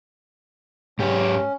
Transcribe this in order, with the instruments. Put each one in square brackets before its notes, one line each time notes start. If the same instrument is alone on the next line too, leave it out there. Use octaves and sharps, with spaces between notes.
[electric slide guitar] G#2 G4 [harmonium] C#4